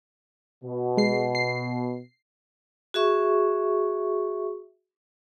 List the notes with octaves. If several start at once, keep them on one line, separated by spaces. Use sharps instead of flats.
B2
G#3 C7
C7
F#4 G#4 E5 C#6